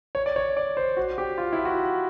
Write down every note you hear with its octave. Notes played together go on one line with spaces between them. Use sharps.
C#5
D5
C#5
D5
C5
F#4
G4
F4
E4
F#4